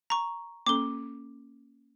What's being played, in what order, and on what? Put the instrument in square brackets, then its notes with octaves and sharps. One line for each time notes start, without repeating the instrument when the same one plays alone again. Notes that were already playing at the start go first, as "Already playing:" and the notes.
[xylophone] A#5 C#6
[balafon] A#3 C#4 A4 [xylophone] D6 G7